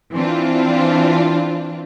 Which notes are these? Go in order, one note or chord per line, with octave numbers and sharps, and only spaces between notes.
E3 C4 D4 F4